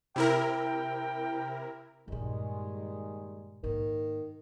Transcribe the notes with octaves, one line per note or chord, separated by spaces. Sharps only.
C3 E4 A#4 G5
G2 A#2 D#3 G3 G#3
G#2 D#3 A#3